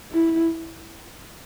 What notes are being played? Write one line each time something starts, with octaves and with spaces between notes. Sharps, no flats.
E4